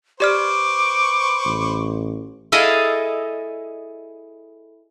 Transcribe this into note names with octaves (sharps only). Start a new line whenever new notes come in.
G4 B4 C5 D5 C#6 D6 F6
A1
E4 G#4 A4 D#5 F5